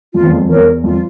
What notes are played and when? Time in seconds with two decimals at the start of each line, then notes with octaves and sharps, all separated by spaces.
0.14 F2 F4
0.23 E2
0.32 F2
0.49 E2 A#4 C#5
0.84 F2 F4